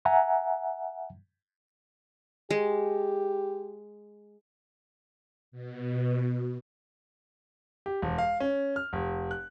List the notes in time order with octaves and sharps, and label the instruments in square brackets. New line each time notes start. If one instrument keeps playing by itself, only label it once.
[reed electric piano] E5 F#5 G#5 A#5
[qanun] G#3 [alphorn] G4
[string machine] B2
[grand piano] G4
E1
F5
C#4
F6
F1
F#6